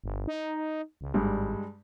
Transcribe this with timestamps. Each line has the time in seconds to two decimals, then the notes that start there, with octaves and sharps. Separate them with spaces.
0.04 G1
0.27 D#4
1.01 C#2
1.14 G#1 G2 G3 G#3